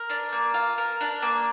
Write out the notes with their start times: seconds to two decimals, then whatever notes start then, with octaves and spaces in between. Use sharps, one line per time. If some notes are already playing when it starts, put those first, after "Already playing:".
Already playing: A#4
0.10 D4
0.33 A#3
0.54 F4
0.78 A#4
1.01 D4
1.22 A#3